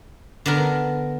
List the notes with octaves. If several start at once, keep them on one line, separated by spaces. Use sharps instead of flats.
D3 B3 A#4